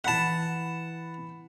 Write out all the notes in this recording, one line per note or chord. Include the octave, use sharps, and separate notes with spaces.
E3 F#5 A5 B5 B6